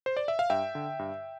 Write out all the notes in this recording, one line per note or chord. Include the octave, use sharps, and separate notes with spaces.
C5
D5
E5
F5
G2 E5 G5
D3
G2